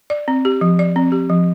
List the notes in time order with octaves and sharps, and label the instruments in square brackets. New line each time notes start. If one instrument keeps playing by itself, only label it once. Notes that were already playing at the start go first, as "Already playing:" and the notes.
[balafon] D5
C4
G4
F3
D5
C4
G4
F3